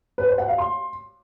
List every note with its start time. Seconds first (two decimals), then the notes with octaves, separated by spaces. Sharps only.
0.18 B4
0.28 C5
0.38 F#5
0.48 F5
0.58 C6